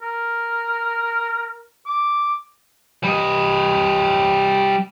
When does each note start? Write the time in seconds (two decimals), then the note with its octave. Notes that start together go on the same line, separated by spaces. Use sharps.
0.02 A#4
1.86 D6
3.03 G3 D#5